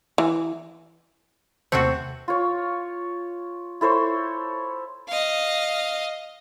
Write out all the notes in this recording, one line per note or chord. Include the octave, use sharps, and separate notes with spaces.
E3
D#2 C3 A3 C4 F#4 C5
F4 C#5
E4 A4 C5 C#5
D#5 F5